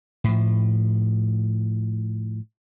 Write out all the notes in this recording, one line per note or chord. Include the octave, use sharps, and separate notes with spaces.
A2 F3